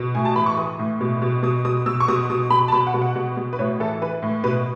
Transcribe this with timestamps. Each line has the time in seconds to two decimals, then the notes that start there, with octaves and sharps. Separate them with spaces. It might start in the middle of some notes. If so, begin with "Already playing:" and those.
Already playing: B2
0.15 A2 G#5
0.25 A5
0.36 E3 B5
0.46 C#6
0.57 E3 D#6
0.79 A2
1.01 B2
1.22 B2
1.43 B2 D#6
1.65 B2 D#6
1.86 B2 E6
2.00 C#6
2.08 B2 D#6
2.30 B2 D#6
2.50 B2 B5
2.68 A5
2.72 B2 B5
2.87 F#5
2.94 B2
3.02 F#5
3.16 B2
3.37 B2
3.53 B4
3.59 A2 C#5
3.80 E3 A4
4.02 E3 B4
4.22 A2
4.44 B2 B4